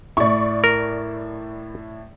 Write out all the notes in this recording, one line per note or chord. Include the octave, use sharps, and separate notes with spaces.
A2 E4 D5 C#6
A#4